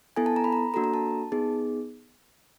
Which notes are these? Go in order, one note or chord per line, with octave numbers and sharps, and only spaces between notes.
B3 E4 A4 G#5
A5
A#5
B5
A#5
A#3 D4 F#4 A4 A#5
A#5
A5
B3 D#4 G#4